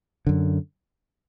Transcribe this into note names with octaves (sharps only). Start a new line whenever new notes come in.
F#2 D3